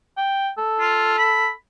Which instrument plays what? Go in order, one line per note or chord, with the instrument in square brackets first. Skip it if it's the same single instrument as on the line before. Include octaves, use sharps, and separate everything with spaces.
[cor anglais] G5
A4
[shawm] F4
B5